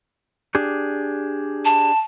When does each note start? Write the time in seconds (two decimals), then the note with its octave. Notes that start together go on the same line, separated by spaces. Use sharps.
0.55 D4 G4 G#4
1.65 A5